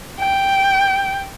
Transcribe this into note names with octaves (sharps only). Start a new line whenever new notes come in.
G5